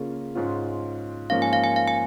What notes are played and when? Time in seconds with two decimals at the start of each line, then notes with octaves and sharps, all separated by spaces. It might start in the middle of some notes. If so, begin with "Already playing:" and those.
Already playing: C#3 A#3 C#4 F4 G#4
0.35 G#2 G#3 C#4 F4
1.30 G#2 F3 A#3 C#4 F5
1.42 G#5
1.53 F5
1.64 G#5
1.76 F5
1.88 G#5